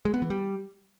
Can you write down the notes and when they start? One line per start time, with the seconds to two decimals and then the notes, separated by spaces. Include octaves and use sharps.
0.05 G#3
0.14 B3
0.22 E3
0.30 G3